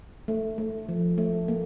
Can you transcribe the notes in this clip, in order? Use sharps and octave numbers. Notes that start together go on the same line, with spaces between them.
A3
A3
F3
A3
A#3